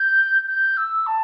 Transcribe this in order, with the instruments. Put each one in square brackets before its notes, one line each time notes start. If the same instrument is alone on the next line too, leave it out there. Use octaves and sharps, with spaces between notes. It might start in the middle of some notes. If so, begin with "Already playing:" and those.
Already playing: [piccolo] G6
G6
E6
A5